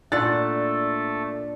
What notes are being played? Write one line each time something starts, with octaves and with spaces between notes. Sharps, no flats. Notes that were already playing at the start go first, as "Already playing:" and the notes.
A#2 A3 D4 A4 F#5 A6